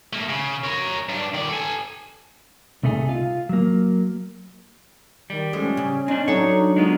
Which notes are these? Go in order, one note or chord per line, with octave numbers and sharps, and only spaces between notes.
A3 A#3
C#3
A#4 C#5
G2 D4
D#3 D5
A4 G#5
C2 C3 A3 D#4 G#4
F4 F5
F#3 A#3
D#3 G3
F3 G#3 A3 C#4
C#3
C4 D4 D#4
F#3 D4 D#4 A4 C#5
G#3 B3 F4